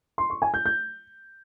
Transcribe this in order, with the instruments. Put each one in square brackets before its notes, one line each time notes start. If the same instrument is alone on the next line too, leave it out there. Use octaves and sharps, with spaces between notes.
[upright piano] C6
C#6
G#5
G6
G6